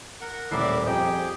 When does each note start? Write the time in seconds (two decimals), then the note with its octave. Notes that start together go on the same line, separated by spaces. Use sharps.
0.21 A#4 F#5
0.52 D#1 A2 E4 A#4 D5 E5 C7
0.86 F2 G4 G#4 C5 D#5 G5 A#5